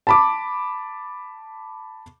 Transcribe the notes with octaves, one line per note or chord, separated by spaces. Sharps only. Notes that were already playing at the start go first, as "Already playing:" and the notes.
A5 B5 D6